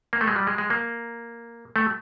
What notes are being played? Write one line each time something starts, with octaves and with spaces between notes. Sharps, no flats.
A#3
A3
G#3
G3
G#3
G#3
A#3
A3